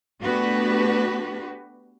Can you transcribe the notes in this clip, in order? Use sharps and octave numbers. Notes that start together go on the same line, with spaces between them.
A3 B3 D4 F#4 G4 B4